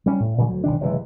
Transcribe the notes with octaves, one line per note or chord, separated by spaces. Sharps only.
G3 C#4
A2
A#2 D3 G3
D2 F#3
B1 D#3 D4
F#1 C3 E3 G#3